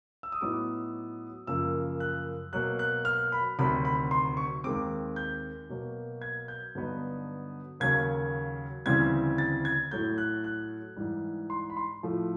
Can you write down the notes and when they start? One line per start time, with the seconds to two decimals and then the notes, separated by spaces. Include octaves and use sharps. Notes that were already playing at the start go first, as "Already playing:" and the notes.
0.23 E6
0.32 D#6
0.41 A2 F#3 B3 D#4 D6
1.47 F#2 C#3 F3 A#3 E6
2.00 F#6
2.53 B2 F#3 A#3 F#6
2.79 F#6
3.05 F6
3.32 B5
3.59 D2 C3 D#3 F#3 B5
3.85 B5
4.11 C6
4.37 C#6
4.64 D#2 D#3 G#3 C4 D6
5.16 G6
5.69 B2 F#3 A#3
6.22 G#6
6.48 G6
6.75 G2 D3 F#3 B3 D#4
7.80 D#2 C#3 F#3 A#3 G#6
8.86 D2 C#3 E3 G3 C4 G#6
9.38 A6
9.65 G#6
9.91 A2 F#3 A3 G6
10.18 F#6
10.44 F#6
10.96 G#2 E3 G3
11.50 C6
11.70 B5
11.77 C6
12.03 A2 F3 A3